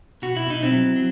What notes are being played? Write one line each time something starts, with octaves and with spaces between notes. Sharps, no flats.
B2 F#4
E4
B2 D#4
C4 E4
F#3
F#3